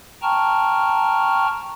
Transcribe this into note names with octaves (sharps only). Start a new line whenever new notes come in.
G5 A5 A#5 C#6 F6